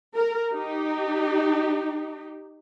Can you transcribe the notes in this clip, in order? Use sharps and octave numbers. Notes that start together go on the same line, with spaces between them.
A#4
D#4 G4